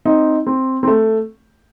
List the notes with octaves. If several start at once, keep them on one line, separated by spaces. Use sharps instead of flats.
C4 D#4
C4
C4
A3